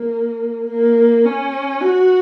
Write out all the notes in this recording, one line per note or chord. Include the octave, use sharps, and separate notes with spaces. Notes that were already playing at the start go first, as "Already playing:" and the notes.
Already playing: A#3
A#3
C#4
F#4